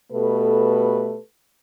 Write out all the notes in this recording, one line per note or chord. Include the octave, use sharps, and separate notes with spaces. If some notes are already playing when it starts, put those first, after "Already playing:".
B2 A3 G4 A4 B4